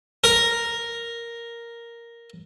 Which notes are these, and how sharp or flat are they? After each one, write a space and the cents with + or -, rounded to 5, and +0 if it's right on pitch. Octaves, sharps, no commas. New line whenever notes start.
A#4 +0